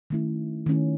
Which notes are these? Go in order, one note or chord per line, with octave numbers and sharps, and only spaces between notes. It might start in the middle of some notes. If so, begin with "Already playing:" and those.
D#3 A3 C#4 E4
D#3 A3 C#4 E4